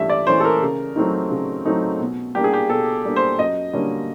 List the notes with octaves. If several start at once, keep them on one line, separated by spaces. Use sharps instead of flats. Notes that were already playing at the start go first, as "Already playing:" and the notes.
Already playing: G2 E3 A3 C#4 E5
D5
E3 A3 C#4 C5
A4
A#4
C#3
F#3 A3 C4 D#4
C#3
F#3 A3 C4 D#4
B2
G3 A#3 D4 G4
G#4
G4
B2 A4
G3 A#3 D4
C5
F#2 D#5
D3 G3 A#3 C#4